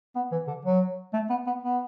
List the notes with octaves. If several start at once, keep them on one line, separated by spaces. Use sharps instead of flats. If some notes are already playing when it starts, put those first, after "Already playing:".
B3
E3
D3
F#3
A3
B3
B3
B3